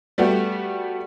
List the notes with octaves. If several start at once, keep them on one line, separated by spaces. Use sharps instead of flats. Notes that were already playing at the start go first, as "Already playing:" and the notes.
G3 A3 B3 F#4 G4